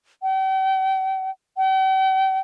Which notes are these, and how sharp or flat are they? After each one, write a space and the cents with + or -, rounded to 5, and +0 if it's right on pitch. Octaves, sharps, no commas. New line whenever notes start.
G5 -45
G5 -45